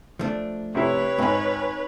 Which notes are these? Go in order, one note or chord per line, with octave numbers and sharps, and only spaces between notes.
F3 A3 D4
C3 E4 B4 C#5
G#1 C4 D#4 B5